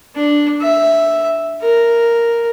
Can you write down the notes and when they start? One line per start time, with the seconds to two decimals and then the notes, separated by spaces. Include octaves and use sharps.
0.15 D4
0.61 E5
1.61 A#4